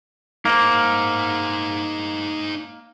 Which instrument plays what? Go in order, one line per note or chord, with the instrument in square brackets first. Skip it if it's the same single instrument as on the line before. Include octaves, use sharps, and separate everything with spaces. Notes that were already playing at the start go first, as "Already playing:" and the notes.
[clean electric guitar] A#3 [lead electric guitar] D#4 C5